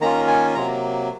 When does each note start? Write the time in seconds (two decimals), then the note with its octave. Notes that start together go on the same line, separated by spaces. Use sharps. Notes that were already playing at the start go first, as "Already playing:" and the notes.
0.01 D#3 A#3 C#4 F4 A#5
0.28 G#5
0.55 C3 F#3 A#3 A#5